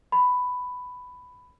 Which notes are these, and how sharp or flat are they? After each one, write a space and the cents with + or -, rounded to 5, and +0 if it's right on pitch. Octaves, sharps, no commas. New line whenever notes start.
B5 +10